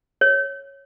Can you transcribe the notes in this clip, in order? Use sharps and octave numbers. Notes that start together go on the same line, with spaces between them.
C#5